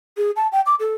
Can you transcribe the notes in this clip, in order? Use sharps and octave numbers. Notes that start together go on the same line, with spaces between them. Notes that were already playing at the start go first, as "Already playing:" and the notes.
G#4
A5
G5
D6
A4